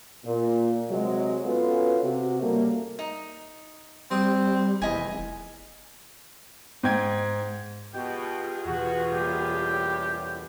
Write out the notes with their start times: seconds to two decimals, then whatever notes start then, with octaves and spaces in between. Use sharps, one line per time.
0.25 A#2
0.89 C3 F#3 G#3
1.45 B3 C#4 F4 F#4 A4 B4
2.02 C3 F#4
2.41 A2 C#3 G3 A3 A#3
2.99 D#4
4.11 G3 C4 D#6
4.82 F1 E2 D#5 G#5
6.83 G#2 G5 G#6
7.94 B2 F4 G4 G#4 G5
8.65 E2 B2 F#4
9.11 F#2 A2 G3 A#3 G4